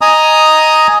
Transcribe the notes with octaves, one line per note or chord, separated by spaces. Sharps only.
D#5 G#5 A#5 D#6